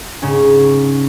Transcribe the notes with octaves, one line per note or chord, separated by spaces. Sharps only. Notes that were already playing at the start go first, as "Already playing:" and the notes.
G#2 C#3 C#4